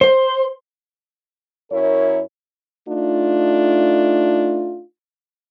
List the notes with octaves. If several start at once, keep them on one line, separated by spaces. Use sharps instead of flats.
C5
F#2 E4 A#4 C#5
A3 D4 D#4 F4